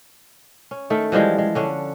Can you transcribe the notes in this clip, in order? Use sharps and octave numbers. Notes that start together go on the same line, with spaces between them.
C#4
D#3 A3 A4
E3 F3 G3 G#3
G#3
D3 C#4 D4